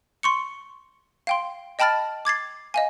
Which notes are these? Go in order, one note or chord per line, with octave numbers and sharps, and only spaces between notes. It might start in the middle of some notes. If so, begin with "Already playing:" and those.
C6 C#6 C#7
F5 G5 C6
D#5 G5 A5 B5 F6 A6
D6 G#6 A6 C7
D#5 F5 G#5